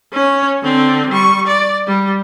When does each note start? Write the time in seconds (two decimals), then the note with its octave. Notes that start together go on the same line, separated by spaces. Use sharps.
0.12 C#4 C#5
0.63 D3 C4
1.10 G3 C#6
1.48 D5
1.87 G3